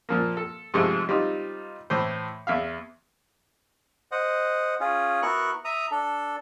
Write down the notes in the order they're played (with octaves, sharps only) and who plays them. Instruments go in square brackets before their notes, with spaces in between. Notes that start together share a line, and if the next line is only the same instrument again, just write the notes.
[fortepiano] A#2 F3 A#3
A4
G#2 C3 F3 G#3 A3
G3 C4 D#4 F4
A2 E3 C5
E2 E5 F5
[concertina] C5 D#5 F#5
C#4 F4 G#4
B3 E4 F#4 A#4 C#6 F#6
E5 A#5 D#6
D4 A4